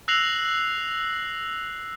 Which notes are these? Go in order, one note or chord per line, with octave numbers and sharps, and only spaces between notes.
E6 F#6 A#6 C7 F7 F#7